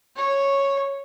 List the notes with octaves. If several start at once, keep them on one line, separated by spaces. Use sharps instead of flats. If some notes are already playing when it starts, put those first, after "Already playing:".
C#5